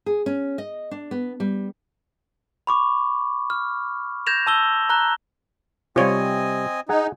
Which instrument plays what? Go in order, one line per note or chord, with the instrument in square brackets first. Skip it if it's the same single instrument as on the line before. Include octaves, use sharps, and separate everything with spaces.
[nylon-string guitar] G#4
C#4
D#5
D4
B3
G3
[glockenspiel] B5 C#6 D6
F6
G6 G#6 A#6 E7 F7
A5 E6 G7
A#5 F#6 G7
[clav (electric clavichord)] C3 G3 [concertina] C4 D#5 G#5 [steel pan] F4 C#5
[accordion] D#4 [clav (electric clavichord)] G#4 F#5 G#5